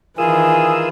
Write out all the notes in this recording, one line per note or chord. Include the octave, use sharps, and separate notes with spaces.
D#3 E3 F4 G#4 A#4 G#5 D#6 E6